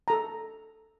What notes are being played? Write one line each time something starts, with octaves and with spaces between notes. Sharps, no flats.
A4 A#5